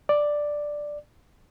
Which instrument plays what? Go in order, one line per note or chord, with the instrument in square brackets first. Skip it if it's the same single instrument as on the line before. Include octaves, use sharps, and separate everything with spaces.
[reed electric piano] D5